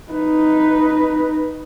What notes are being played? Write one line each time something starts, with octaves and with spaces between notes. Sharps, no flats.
D#4 B4